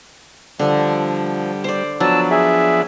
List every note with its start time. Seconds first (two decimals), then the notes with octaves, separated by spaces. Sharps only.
0.59 D3 F3 G3
1.64 C5 D5
2.00 F3 F#3 B3 D4 A5 E6
2.31 G#4 E5